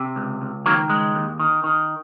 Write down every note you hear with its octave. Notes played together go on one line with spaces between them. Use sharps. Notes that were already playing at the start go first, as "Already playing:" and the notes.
Already playing: C3
C#2
C#2
D#3 F#3 A#3
C#2 G#3
D#2
D#3
D#3